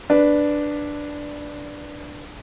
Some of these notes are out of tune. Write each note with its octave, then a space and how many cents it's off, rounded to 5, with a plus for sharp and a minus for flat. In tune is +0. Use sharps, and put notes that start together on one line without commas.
D4 +0 B4 +0